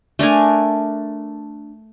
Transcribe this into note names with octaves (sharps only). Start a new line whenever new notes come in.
A3 D4 A#4 G#5